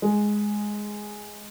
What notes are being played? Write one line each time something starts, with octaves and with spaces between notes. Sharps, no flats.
G#3